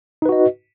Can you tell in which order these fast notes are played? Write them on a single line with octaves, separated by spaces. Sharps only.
D#4 B4 F#4 D#5